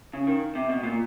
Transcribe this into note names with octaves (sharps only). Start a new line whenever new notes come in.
C#3
D#3
C3
B2
A#2